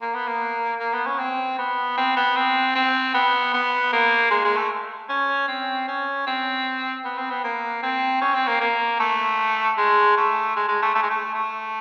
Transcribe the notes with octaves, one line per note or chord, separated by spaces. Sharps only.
A#3
B3
A#3
A#3
B3
C#4
C4
B3
C4
B3
C4
C4
B3
B3
A#3
G#3
G#3
A3
C#4
C4
C#4
C4
B3
C4
B3
A#3
C4
C#4
C4
A#3
A#3
A3
G#3
A3
G#3
G#3
A3
A3
G#3
A3
A3